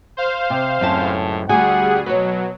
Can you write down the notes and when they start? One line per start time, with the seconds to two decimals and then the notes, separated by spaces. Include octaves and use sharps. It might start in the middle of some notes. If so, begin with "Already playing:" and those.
0.17 C5 F5
0.50 C3
0.81 C#2 F#2 A2 C4 A5
1.49 D2 G3 F#4 G#4 F#5 G#5
2.06 B2 F#3 B4 C#5